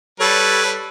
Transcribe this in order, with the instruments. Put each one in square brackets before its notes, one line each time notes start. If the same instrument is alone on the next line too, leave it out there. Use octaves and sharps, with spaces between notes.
[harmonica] G3 B4 [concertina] A4 C#5